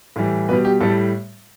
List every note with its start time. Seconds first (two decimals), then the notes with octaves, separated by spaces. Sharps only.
0.16 A2 E3 G3
0.49 B2 G3 B4
0.65 G4
0.80 A2 G3 A4